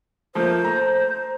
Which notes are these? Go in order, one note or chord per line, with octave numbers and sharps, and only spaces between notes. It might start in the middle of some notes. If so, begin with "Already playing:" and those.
F3 A3 A#3 C5
A#5